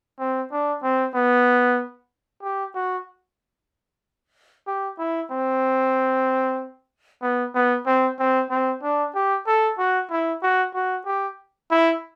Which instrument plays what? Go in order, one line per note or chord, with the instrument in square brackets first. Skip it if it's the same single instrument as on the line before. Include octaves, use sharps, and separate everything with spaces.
[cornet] C4
D4
C4
B3
G4
F#4
G4
E4
C4
B3
B3
C4
C4
C4
D4
G4
A4
F#4
E4
F#4
F#4
G4
E4